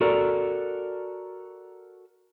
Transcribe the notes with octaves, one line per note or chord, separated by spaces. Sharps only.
F#4 A4 A#4 D5